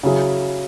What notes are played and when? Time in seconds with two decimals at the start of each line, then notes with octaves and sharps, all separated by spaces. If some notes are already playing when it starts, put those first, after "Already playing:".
0.03 C#3 F#3 E4 G#4